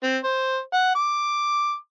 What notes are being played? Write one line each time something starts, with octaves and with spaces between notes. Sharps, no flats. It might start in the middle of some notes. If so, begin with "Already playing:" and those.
C4
C5
F#5
D6